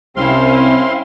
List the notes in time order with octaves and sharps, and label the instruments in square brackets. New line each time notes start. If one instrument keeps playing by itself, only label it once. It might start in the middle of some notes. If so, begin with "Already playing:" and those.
[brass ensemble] C2 C3 [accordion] C4 F5 C6 [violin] C#4 E4